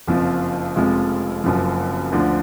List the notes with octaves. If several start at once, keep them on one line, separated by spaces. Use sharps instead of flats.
F#1 F2 F3
F1 F2 F3 G#3
F#1 F#2 F3
D2 D3 F3